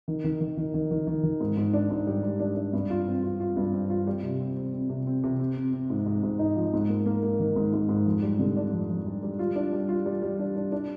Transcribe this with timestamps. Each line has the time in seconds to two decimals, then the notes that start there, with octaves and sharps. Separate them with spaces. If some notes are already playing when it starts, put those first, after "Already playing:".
0.08 D#3
0.24 D#3
0.41 D#3
0.57 D#3
0.74 D#3
0.91 D#3
1.07 D#3
1.23 D#3
1.40 G#2
1.57 G#2
1.73 D4
1.90 G#2
2.07 G3
2.23 G3
2.40 D4
2.56 D4
2.73 G2
2.90 F4
3.07 C4
3.24 F4
3.40 F4
3.56 G2
3.74 C4
3.90 F4
4.07 G3
4.23 C3
4.40 C4
4.57 C4
4.73 C4
4.90 C3
5.07 C4
5.24 C3
5.39 C4
5.56 C4
5.73 C4
5.90 G#2
6.06 G#2
6.23 G#2
6.39 D#4
6.56 F3
6.73 G#2
6.89 A#3
7.06 A#3
7.23 A#3
7.39 D#3
7.56 G#2
7.73 G#2
7.89 G#2
8.05 F2
8.22 G3
8.39 D3
8.56 D4
8.72 F2
8.90 F2
9.06 G3
9.23 G3
9.39 F4
9.56 D4
9.73 G3
9.89 F4
10.06 G3
10.22 G3
10.39 D4
10.56 D4
10.72 D4